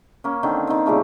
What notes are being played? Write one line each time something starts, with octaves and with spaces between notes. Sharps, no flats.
A#3 C#4
D3 D#3 C4
D#3 C4
A#2 C#3 G3 A3